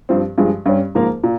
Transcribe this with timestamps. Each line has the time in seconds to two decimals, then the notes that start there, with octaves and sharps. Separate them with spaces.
0.09 G2 F3 C4
0.38 G2 F3 G#3
0.66 G2 G3 C#4
0.95 G#2 F3 A#3 F4 A#4
1.23 A#2